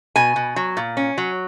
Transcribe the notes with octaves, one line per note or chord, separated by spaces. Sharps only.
B2 G#5
B2
F#3
A#2
C#4
F#3